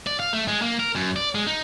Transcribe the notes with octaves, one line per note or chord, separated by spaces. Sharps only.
D5
F5
A3
G#3
A#3
A#4
F#2
D5
G#3
D#4